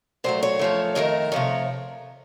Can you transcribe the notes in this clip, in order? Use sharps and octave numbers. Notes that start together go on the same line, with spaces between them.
A#2 F#3 A3 C5
C#5
F#2 F3 A3
F2 D#3 A3 A#4
C3 F3 A3 C#5